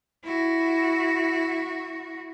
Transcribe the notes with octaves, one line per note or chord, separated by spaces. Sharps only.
E4 F#4